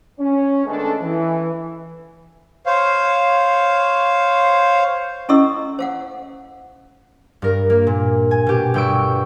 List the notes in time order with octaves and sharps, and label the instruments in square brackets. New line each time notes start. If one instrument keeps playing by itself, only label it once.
[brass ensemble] C#4
D#3 G#3 A3 B3 D4 A4
E3
[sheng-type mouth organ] C5 C#5 F5
[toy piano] C#4 E4 A4 D#5 C#6 E6
C5 F5 F#5
[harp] G2 A#4
A#3
A#2
G#5
B2 G4
G1 B4 G5 C#6 E6 D7